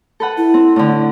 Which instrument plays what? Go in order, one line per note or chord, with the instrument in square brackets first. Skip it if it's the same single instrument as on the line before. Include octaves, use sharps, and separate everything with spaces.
[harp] A4 B4 F#5
[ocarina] E4
[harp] C4
A2 D3